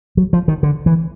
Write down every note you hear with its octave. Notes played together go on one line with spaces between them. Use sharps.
F#3
F3
D#3
D3
E3